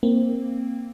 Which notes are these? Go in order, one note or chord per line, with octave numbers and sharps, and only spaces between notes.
A#3 C4